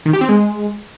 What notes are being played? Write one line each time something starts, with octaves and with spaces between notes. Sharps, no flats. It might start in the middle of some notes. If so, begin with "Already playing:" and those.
D#3
G4
C4
G#3